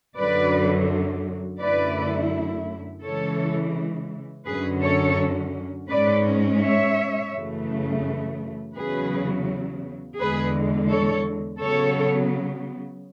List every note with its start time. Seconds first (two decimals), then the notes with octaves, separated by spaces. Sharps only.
0.17 F#2 D3 F#3 B4 D5
1.60 F#2 D3 A3 E4 B4 D5
3.03 C#3 E3 G#3 A4 C#5
4.46 F#2 D3 F#3 C#4 G#4 B4
4.82 A4 C#5
5.89 G#2 G#3 C#4 B4 D5
6.60 C#5 E5
7.32 F#2 C#3 E3 A3
8.75 E2 C#3 F#3 G#4 B4
10.18 E2 D3 G#3 G#4 B4
10.89 A4 C#5
11.61 C#3 F#3 B3 A4 C#5